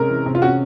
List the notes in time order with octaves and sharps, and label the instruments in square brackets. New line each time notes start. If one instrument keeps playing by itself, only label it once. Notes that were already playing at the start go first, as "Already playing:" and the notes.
Already playing: [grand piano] C3 G#3 C#4 [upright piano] A#4
[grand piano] E3
C3
[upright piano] F4
[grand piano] C#4 [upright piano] F#4